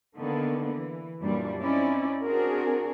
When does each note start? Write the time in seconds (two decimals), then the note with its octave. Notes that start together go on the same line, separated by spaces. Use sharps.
0.16 D3 D#3 A#3 B3 D4
0.74 E3
1.23 F#2 A#2 E3 G3 D4
1.61 C4 C#4 D#4 E4 D5
2.23 C4 D4 F#4 G#4 A#4